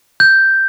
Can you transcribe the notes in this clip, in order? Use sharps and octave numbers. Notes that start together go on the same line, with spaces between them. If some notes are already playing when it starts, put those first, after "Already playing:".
G6